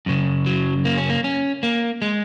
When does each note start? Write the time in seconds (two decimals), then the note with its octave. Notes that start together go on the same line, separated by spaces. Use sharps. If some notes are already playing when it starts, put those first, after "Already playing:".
0.06 F#2 C#3
0.46 F#3
0.85 A#3
0.97 C#4
1.10 A#3
1.24 C#4
1.63 A#3
2.02 G#3